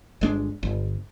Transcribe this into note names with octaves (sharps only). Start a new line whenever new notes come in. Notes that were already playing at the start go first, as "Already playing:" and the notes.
G1 G#3 D4
G1